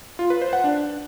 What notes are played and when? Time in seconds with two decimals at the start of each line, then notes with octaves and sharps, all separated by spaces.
0.19 F4
0.30 B4
0.42 C5
0.53 F#5
0.64 D4